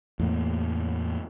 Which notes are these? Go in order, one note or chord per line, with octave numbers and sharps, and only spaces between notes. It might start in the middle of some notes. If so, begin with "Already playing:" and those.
E2 A2 A#3